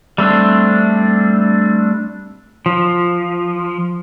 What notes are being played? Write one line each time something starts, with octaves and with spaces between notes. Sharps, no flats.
G3 A3 C4 D4
F3